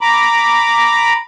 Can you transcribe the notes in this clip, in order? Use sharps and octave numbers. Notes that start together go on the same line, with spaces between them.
A#5 B5 D6